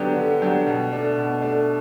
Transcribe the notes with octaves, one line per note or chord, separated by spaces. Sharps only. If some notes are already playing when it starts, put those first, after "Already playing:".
Already playing: D3 F#3 B3 D4 G4
D3
F#3 B3 D4 G4
B2
A3 D4
B2
A3 D4